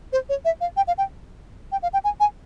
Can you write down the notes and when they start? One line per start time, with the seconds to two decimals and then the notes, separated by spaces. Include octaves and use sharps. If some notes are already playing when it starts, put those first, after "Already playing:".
0.13 C5
0.29 C#5
0.45 E5
0.61 F5
0.77 G5
0.87 F5
0.98 G5
1.72 G5
1.82 F5
1.93 G5
2.04 G#5
2.20 G#5